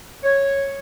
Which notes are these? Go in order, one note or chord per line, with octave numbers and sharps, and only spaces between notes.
C#5